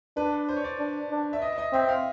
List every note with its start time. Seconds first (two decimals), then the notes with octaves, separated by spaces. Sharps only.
0.17 D4 B4
0.49 C5
0.56 C#5
0.64 D5
0.79 D4
1.10 D4
1.33 E5
1.42 D#5
1.52 E5
1.58 D#5
1.73 C4 E5
1.89 F5